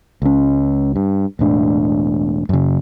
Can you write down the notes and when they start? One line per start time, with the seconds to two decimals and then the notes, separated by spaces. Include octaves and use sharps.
0.22 C#2 C#4
0.96 G2
1.39 E1 A2 D4
2.49 F#2 C#3